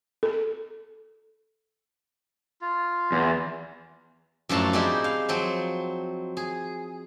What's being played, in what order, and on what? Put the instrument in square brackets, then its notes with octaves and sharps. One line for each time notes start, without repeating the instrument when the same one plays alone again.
[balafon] A4
[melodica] F4
[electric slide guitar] E2
[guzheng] F#2 A2 F3 D4 A5 A#5
G3 G#3 C4 D#4 E4 G4
F5
F3 F#3 C4
G#4